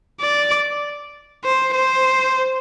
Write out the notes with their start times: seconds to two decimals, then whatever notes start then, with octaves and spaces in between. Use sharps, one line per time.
0.21 D5
1.44 C5
1.74 C5